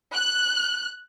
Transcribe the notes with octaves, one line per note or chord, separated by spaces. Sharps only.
F#6